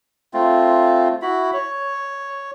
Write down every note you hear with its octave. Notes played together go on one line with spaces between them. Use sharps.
A3 C4 F4
E4 F#4 B5
C#5